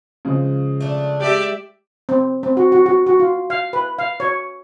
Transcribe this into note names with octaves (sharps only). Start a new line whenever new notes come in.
C#3 F3 G#3
A3 D4
G#3 G4 D5 E5
C4
C4
F#4
F#4
F#4
F#4
F4
F5
B4
F5
C#5